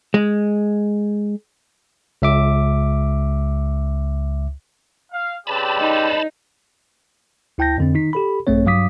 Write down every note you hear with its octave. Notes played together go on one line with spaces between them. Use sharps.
G#3
C#2 E5 D6
F5
C#3 C4 G4 B4 D5 A5 B5
D#4
D2 E4 G5 A5 G6 A#6
F2 D3 C4
D#3 D#4 B6
G4 A4 B5
A#1 G2 A3 C4 C#5
G2 F#3 F5 D6 D#6 B6